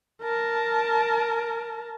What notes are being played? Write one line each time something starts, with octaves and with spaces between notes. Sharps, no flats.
A#4 A5